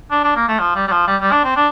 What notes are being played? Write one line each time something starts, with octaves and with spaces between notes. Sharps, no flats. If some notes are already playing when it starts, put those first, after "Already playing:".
D4
D4
A#3
A3
F3
G3
G3
F3
G3
G3
D4
C4
D4